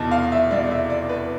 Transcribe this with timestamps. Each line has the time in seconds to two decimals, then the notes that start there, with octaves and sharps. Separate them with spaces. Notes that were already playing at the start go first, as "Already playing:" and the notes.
Already playing: F1 E2 B2 A5
0.11 F5
0.32 E5
0.51 F1 E2 B2 D5
0.71 E5
0.90 D5
1.09 B4